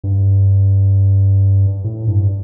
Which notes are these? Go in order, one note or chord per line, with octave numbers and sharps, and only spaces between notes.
G2
A2
G2